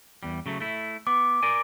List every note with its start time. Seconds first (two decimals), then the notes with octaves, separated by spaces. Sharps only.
0.23 E2 G3
0.46 C#3 F#3 A3
0.60 A3 E4
1.07 B3 D6
1.43 A#4 D5 G#5